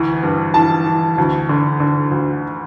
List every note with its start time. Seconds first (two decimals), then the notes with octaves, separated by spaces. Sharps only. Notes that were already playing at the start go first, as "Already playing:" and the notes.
Already playing: D2 E3
0.23 G2
0.54 E3 A5
0.86 E3
1.18 D2
1.49 D3
1.80 D3
2.11 D2